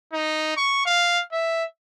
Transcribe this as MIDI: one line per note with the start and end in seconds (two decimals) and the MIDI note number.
0.13 0.53 63
0.57 0.85 85
0.86 1.20 77
1.32 1.64 76